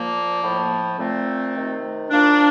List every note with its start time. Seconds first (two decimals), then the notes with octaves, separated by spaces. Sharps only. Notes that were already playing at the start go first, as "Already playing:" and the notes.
Already playing: A#2 F3 A#3
0.41 A2 F3
0.98 A#2 F3 A3 C4
1.54 C3 D#3
2.10 A#2 F3 A#3 D4